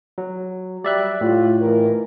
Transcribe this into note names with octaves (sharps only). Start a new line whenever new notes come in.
F#3
G3 D5 E5 F#6
A2 F4
D#3 E3 A#4